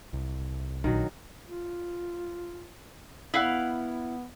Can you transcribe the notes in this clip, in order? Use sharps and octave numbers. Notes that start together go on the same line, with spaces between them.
C2
A#1 D#3 F#3
F4
B3 E4 F5 F#5